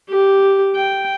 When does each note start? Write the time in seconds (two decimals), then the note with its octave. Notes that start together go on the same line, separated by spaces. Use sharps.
0.10 G4
0.75 G5